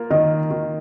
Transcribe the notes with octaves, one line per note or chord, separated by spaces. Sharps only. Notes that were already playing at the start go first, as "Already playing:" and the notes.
Already playing: A#3 F4
D#3 D#5
D#3